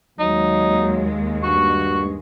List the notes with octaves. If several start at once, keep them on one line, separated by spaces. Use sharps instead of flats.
D#2 F#3 G#3 D#4
G2 F#4 C#6